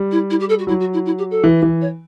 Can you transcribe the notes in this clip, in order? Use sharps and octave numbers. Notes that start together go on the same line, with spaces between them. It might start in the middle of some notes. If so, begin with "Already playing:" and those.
Already playing: G3
E4
E4
G4
A4
F#4
F#3 E4
F#4
E4
E4
G4
A4
E3
E3
C#5